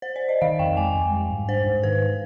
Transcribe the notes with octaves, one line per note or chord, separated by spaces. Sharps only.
C5
D5
D#5
D#3 F5
F2 G5
G#3 G#5
F2
G3
G#2
D4 C5
G#2
D#3 B4